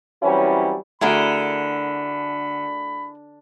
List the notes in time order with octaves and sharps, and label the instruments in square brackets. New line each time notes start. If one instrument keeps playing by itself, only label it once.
[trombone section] E3 F#3 G3 C4 C#4 E4
[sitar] D3 [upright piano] A3 F#4 [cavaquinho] E4 G#4 A#4 [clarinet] B5